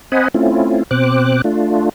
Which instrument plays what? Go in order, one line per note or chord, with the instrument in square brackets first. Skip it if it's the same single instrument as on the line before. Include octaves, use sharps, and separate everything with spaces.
[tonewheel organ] C4 C5 D#5 F#5 G#5 B5
A3 C4 C#4 E4 F4
B2 C4 C5 D6 F#6
A3 D4 F4